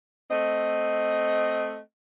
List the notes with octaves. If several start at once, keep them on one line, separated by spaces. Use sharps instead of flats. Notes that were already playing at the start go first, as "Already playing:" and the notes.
A3 C4 D#5